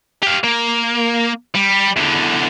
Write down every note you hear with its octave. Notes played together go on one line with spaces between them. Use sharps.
G4 F5
A#3
G3
E2 D3